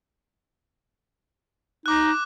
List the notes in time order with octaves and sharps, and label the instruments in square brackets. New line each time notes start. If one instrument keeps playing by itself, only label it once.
[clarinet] D#4 [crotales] D6 F#6